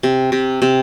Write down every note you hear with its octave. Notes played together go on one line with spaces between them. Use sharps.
C3
C3
C3